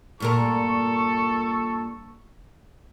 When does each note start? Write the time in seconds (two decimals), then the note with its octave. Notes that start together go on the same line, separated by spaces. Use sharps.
0.20 G2 A#2 A4 A#4 C#6